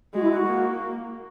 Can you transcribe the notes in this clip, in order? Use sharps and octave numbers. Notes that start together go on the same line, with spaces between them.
G#3 F#4
E4
F#4
A#3